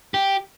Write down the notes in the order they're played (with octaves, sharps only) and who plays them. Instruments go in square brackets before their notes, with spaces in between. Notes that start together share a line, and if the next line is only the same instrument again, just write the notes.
[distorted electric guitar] G4